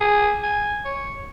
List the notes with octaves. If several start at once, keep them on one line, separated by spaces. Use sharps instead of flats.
G#4
G#5
C#5